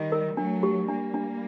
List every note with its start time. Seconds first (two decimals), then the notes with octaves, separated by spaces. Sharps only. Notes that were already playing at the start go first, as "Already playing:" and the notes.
Already playing: D#3 G3
0.12 A#4
0.37 F#3 A3 D4
0.63 G4
0.88 G3 A#3 D4
1.14 D4